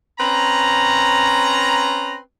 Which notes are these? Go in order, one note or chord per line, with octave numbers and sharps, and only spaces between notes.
C4 C#4 B4 A#5